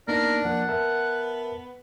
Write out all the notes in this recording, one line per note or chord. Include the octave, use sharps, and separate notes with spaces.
A#3 B3 D4 D#4 A#4
F3 A#3 F#5
B3 A#4 E5 A5